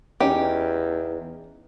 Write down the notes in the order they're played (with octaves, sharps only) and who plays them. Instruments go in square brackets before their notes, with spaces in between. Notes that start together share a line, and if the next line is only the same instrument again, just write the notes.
[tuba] E2 [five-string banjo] C#4 D#4 G4